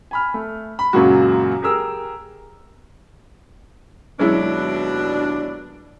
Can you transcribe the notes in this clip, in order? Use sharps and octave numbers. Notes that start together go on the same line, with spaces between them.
G#5 B5 F6
A3
B5
F#2 A#2 C#3 F#3 G#3 F#4
G4 G#4 A#4 E6
D#2 B2 F#3 G#3 D4 E4